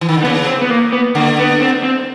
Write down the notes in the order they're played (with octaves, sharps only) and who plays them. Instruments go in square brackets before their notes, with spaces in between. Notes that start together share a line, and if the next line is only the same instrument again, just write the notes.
[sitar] E3
D#3
D3
[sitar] C#3 [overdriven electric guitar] B3
[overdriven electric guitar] C4
B3
A#3
B3
[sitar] D3 [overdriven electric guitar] A#3
[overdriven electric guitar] B3
C4
C4